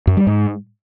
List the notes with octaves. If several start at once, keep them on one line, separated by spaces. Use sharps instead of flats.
F#2
G3
G#2